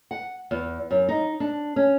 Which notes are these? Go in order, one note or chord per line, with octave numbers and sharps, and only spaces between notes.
F#5
E2
F#2
D#4
D4
C#4